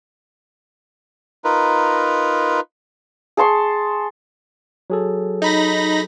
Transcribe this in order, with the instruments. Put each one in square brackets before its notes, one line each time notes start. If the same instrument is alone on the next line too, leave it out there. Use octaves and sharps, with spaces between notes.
[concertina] D#4 F4 A#4 B4
[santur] G#4 A5 C6 C#6
[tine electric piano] F#3 G#4 A4
[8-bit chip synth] D#4 B5 A#6